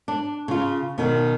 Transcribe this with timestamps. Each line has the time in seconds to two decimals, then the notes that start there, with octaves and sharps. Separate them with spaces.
0.08 D4
0.48 C#3 F4
0.98 B2 D#3